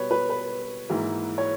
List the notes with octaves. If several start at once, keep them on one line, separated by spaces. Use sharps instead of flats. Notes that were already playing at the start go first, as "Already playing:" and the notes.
Already playing: B2 G3 B3 B4 C#5
B4
B4
G#2 E3 A#3 E4
C#5